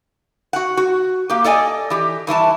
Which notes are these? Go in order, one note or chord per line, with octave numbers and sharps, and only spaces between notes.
F#4 F#5
F#4
A#3 G4
A4 D5 D#5 G#5
E3 G4
G2 E3 E4 A5